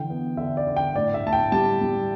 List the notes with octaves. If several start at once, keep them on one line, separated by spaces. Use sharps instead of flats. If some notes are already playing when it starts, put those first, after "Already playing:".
Already playing: D3 E3 G5
B3
D3 E5
D5
D3
G5
A2 D5
E5
A2 A5
G5
G3 A5
G3